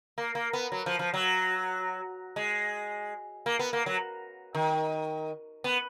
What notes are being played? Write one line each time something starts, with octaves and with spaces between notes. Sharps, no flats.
A#3
A#3
B3
F#3
F3
F3
F#3
G#3
A#3
B3
A#3
F#3
D#3
B3